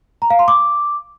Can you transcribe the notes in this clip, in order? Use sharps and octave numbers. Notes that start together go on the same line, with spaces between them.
A#5
F5
C6
D6